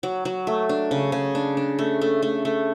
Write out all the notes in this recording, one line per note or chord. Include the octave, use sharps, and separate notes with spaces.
F#3
F#3
A3
D4
C#3
C#3
D4
D4
A3
A3
A3
A3